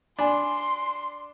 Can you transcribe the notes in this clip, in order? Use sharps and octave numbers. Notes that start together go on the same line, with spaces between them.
D4 G#5 B5 C6